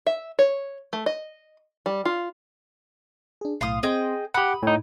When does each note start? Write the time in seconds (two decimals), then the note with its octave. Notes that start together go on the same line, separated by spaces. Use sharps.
0.07 E5
0.39 C#5
0.93 A3
1.06 D#5
1.86 G3
2.05 F4
3.41 D4 G#4
3.61 B1 A2 F5 C6 D#6
3.83 C4 G#4 D#5 G5 C6
4.34 G4 F#5 B5 D#6
4.63 A2 D#4 G#5 D6